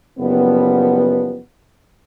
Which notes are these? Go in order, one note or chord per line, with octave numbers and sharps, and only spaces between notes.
F#1 F3 G3 B3